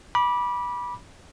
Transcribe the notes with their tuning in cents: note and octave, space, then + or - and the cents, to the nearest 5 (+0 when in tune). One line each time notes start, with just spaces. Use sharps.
B5 -20 D6 +0